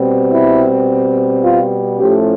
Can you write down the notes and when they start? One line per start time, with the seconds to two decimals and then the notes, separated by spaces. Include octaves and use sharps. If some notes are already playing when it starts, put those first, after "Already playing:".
Already playing: B2 G3 C4
0.32 E4
1.43 F4
1.99 A2 F3 A3 C#4 G4